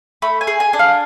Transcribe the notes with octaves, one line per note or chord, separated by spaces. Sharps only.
A3 B5
G#5
G#4
G#5
D4
F5